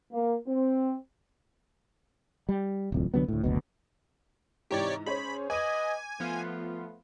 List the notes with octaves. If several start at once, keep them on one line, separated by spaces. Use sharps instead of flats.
A#3
C4
G3
D1 C2 F2
C2 D3 F#3 B3
D2 A2
F#1 D2 B2
G#2 C3 E3 G4 C#5 D5
C#4 G#4 C5 C#5 B5
B4 D#5 G#5 D6 D#7
F3 A3 B3 F4